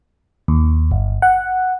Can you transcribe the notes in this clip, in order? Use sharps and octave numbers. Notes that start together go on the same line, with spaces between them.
D#2
G1
F#5